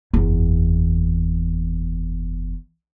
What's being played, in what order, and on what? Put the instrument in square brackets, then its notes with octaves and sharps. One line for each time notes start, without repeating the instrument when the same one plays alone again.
[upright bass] F#1 E2